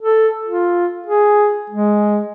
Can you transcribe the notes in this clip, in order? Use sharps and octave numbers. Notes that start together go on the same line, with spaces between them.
A4
F4
G#4
G#3